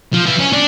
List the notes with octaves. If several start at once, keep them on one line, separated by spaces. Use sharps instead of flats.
F3
E3
C#4
D4